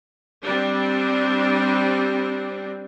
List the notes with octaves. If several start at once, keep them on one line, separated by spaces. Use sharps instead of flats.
G3 C4 D4